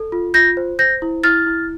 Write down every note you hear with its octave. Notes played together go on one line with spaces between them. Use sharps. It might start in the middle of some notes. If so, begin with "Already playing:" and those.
Already playing: A4
F4
F4 G6 A#6
C5
C5 G6 A#6
E4
E4 F6 A6
E4